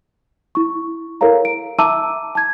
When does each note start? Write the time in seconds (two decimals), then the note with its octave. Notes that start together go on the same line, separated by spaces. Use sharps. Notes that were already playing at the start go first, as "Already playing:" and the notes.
0.55 E4 C#6
1.21 E4 A4 A#4 C#5 F5 A#5
1.45 D7
1.79 E5 A5 A#5 D6 E6 D#7
2.35 A5 G#6